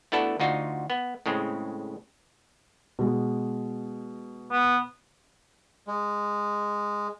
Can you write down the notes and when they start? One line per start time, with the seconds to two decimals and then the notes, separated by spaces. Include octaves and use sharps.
0.12 A3 B3 D4 E4 F#4 A4
0.40 D2 D#4 F4 F#4
0.90 B3
1.26 A2 C#3 G#3 C4
2.99 B2 G#3
4.52 B3
5.88 G#3